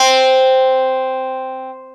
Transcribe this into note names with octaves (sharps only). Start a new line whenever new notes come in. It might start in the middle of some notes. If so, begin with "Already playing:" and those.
Already playing: C4